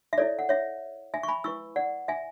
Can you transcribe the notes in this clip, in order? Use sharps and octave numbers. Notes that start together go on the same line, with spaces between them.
E5
E4 A4 C#5 D5
F#5
C#5 E5
E5 G#5
C#6
G#5 B5
E4 B4 C#6 E6
D5 F#5
E5 G#5